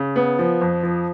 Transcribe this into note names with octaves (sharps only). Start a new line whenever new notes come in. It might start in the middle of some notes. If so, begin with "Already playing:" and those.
Already playing: C#3
B3
F3
F2
F3